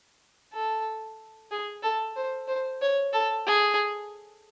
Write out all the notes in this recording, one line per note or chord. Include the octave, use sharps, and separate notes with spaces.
A4
G#4
A4
C5
C5
C#5
A4
G#4